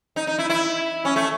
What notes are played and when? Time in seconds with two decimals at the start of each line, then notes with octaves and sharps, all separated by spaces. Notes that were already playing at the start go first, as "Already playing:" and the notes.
0.16 D#4
0.27 D#4
0.38 E4
0.50 E4
1.05 C#4
1.16 A3